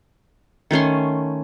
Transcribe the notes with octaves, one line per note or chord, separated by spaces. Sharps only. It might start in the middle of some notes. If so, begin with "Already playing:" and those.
D#3 A3 C#4 C6